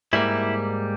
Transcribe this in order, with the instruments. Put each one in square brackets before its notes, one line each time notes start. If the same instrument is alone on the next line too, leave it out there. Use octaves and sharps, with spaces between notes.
[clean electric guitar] G#2 G3 A#3 E4